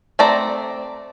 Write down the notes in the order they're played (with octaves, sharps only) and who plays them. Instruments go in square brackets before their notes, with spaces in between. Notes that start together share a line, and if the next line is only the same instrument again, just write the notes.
[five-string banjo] A3 C4 D5 A#5